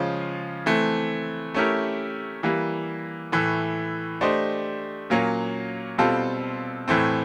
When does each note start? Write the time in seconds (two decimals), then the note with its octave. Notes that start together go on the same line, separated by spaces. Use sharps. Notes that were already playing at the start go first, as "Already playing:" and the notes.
Already playing: C#3 F3 G#3 C#4 F4
0.66 E3 A3 C4
1.54 A3 C#4 E4 G4 A#4
2.43 E3 G3 A#3
3.32 A2 E3 A3
4.21 A3 D4 G4 C5 D#5
5.10 A#2 F#3 A#3 C#4
5.98 B2 G3 C4 F4 A4
6.88 A2 E3 A3 C4